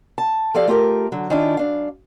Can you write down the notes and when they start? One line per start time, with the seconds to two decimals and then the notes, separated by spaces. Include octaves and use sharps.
0.18 A5
0.54 F3 G4 A4 D5 F5
0.67 A3 F4 G4 A#4
1.12 D3 F#3
1.30 D#3 C#4 D4 E4 F4
1.57 F#2 D4 F5